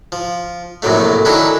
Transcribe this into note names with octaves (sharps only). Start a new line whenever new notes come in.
F3
A#1 F#2 A2 C3 F#3 A3
D#3 F#3 C#4 D4 E4 A4